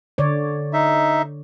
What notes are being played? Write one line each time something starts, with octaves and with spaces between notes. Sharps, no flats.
D3 C#5 D5
D#4 E5